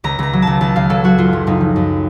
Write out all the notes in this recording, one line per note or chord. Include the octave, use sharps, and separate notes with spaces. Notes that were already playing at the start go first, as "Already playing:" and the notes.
C#2 A#5
C#2 A#5
F#3
C#2 A5
C#2 A5
C#2 F5
F#3 A4
F#3 F#4
F#1 F4
F#1
F#1 D#4
F3
F#2